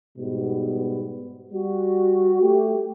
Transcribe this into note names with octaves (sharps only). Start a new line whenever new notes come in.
G#2 B2 G3 B3
G3 F#4
A3 G4